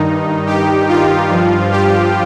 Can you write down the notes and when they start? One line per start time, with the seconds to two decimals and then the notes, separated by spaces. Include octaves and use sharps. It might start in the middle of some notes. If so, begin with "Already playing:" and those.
Already playing: G2 D#3 D#4
0.46 G4
0.88 F4
1.30 G2 F3
1.71 G4